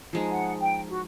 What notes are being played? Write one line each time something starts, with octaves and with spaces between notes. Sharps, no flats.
F3 G#3 D#4
F#5
G5
F#4